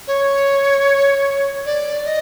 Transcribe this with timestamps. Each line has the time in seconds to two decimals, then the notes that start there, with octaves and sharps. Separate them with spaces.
0.07 C#5
1.66 D5
2.05 D#5